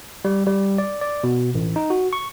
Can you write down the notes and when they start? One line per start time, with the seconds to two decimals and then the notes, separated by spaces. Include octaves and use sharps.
0.25 G3
0.47 G3
0.78 D5
1.01 D5
1.24 B2
1.54 A1
1.76 D#4
1.90 F#4
2.13 C#6